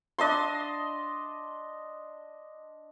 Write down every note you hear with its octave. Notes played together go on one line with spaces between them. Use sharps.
D4 D#5 A5 C6